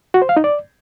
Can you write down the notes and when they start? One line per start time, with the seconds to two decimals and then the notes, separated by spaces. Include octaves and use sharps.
0.14 F#4
0.22 C5
0.29 F5
0.37 D#4
0.44 D5